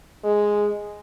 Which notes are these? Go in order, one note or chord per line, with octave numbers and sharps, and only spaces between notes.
G#3